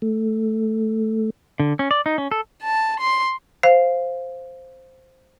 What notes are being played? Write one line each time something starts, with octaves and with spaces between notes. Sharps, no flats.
A3
D3
C#4
D5
D#4
C#4
A4
A5
C6
C5 F5